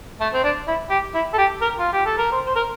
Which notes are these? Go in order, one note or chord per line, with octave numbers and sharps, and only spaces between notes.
A3
C4
D4
E4
G4
E4
A4
G4
A#4
F4
G4
A4
A#4
C5
C5
A#4